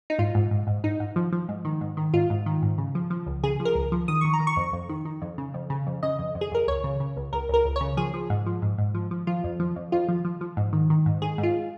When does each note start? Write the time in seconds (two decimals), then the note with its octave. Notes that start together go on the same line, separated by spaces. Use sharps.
0.10 D#4
0.19 G#2 F4
0.35 G#2
0.51 G#2
0.67 G#2
0.84 G#2 D#4
1.00 G#2
1.16 F3
1.32 F3
1.49 G#2
1.65 D#3
1.81 G#2
1.97 D#3
2.13 G#2 F4
2.30 G#2
2.46 D#3
2.62 G#2
2.78 C#3
2.95 F3
3.10 F3
3.27 C#2
3.44 C#3 G#4
3.60 F3
3.65 A#4
3.75 C#2
3.92 F3
4.08 D#3 D#6
4.21 D#3 C#6
4.33 A#5
4.40 D#3
4.47 C#6
4.57 F2
4.73 F2
4.89 D#3
5.05 D#3
5.22 F2
5.38 C#3
5.54 F2
5.70 C#3
5.87 F2
6.03 C#3 D#5
6.19 F2
6.35 F2
6.41 G#4
6.51 F2 A#4
6.68 C#2 C#5
6.84 C#3
7.00 C#3
7.17 C#2
7.32 C#2 A#4
7.49 C#2 A#4
7.65 C#2
7.76 C#3 C#5
7.97 F3 G#4
8.14 F3
8.30 G#2
8.46 F3
8.62 G#2
8.78 G#2
8.95 F3
9.11 F3
9.27 F3 F4
9.44 F2
9.60 F3
9.76 F2
9.92 F2 F4
10.09 F3
10.25 F3
10.41 F3
10.57 G#2
10.73 D#3
10.90 D#3
11.06 G#2
11.22 D#3 G#4
11.38 G#2
11.43 F4